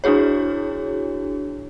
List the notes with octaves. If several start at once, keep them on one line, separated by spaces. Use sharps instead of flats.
D4 E4 F#4 G#4 C#5